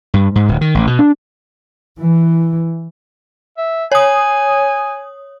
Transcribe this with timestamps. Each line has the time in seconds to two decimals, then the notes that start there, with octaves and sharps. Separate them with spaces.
0.14 G2
0.36 G#2
0.49 D1
0.61 D#3
0.75 A1
0.87 B2
0.99 D4
2.00 E3
3.58 E5
3.92 C#5 G#5 D#6